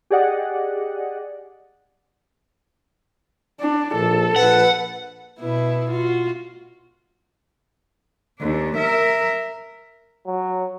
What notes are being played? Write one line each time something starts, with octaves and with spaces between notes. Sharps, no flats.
G4 G#4 D5 D#5 F#5
D4
A#1 A4
A#1 B4 F#5
B2 E4 B4
F4 F#4
D#2 D4
A#4 E5
F#3